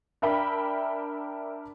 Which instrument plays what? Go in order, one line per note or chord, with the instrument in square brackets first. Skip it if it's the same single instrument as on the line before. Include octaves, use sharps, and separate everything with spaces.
[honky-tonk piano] D4 A#4 E5 G5 B5